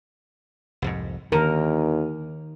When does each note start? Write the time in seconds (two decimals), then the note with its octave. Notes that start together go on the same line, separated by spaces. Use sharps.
0.82 C2 F2 G#2
1.32 D#2 D3 D#3 A#4